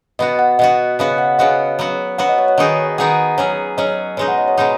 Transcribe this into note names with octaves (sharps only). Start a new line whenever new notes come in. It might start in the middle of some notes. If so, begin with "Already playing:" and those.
B2 B3 F#4 D#5
F#5
B2 B3 F#4 D#5
C#3 B3 F#4 D#5
F#5
C#3 B3 F#4 D#5
F#3 B3 F#4
F#3 B3 F#4 F#5
D#5
C#5
C#5
D#3 B3 D#4 G#4 D#5
D#3 B3 D#4 G#4 F#5
F#3 C#4 G#4
F#3 C#4 G#4 D#5
B2 G#3 D#4 C#5
F#5
D#5
C#5
B2 G#3 D#4